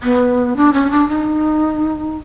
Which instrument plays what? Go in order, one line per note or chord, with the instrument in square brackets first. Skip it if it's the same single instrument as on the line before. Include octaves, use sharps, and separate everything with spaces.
[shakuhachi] B3
D4
C#4
D4
D#4